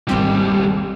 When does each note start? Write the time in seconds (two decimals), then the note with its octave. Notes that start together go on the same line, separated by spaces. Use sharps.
0.08 G#1 D#2 G3 C4 G4